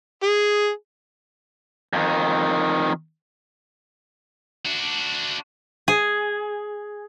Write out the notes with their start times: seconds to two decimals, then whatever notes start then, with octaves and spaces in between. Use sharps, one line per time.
0.23 G#4
1.93 F2 D#3
4.65 D4 F#4
5.88 G#4